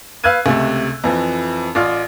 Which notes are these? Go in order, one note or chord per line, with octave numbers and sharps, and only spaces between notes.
B4 F5 E6 F#6 G#6 D#7
C#2 C3 A3
F2 E3 F3
A1 F4 D5 F6